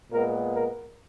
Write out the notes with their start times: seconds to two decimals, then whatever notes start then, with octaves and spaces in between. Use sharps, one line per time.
0.11 A#2 G#3 B3 A#4
0.52 A#4